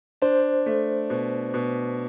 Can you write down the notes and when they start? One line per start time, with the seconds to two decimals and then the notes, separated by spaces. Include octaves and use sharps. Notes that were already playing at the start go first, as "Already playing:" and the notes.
0.22 D4 C5
0.66 A3
1.10 B2
1.54 B2